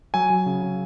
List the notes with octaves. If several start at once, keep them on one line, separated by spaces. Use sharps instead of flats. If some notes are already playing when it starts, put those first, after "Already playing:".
F#3 G#5
F#3
C#3
C#3